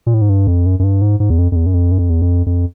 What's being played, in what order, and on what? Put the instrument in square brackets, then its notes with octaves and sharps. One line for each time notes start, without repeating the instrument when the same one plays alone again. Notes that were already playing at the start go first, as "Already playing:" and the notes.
[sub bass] A#2
A2
G#2
G2
F2
F#2
F#2
G2
G#2
G#2
E2
F2
F2
E2
F#2
F2
F#2
F2
E2
F2
F2